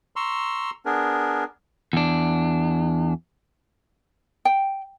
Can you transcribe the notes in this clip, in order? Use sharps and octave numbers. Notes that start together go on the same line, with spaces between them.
A#5 C6 C#6 E6
B3 D4 G#4 A#4
E2 D4
G5